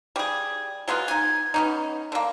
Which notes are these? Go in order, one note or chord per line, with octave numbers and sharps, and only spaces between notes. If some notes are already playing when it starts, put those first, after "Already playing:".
G3 G#4
F#3 G#3 B3 F4
D#4 G#5
B3 C#4 D#4
D3 A#3